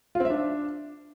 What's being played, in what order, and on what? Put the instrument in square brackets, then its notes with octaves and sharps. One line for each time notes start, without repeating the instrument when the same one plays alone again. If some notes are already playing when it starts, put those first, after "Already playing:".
[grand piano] F4
C4
E5
D4